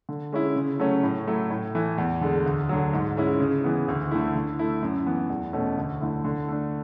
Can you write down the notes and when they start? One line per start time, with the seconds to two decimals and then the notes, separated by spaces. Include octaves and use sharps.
0.09 D3
0.33 G#3 C#4 E4
0.56 C#3
0.79 F#3 A3 C#4
1.03 A2
1.27 F#3 A3 E4
1.50 A2
1.75 E3 A3
1.98 E2
2.21 D3 G#3
2.46 D2
2.69 D3 F#3
2.93 G#2
3.17 G#3 C#4 E4
3.40 C#3
3.64 E3 B3
3.88 D2
4.11 D3 A3 E4
4.36 D3
4.59 A3 E4
4.83 F#2
5.06 E3 B3
5.30 E2
5.53 B2 A3 C#4
5.78 D2
6.01 D3 A3 E4
6.25 D3
6.48 A3 D4